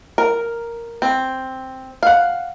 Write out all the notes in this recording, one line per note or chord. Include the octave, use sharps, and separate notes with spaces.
A#4
C4
F5 F#5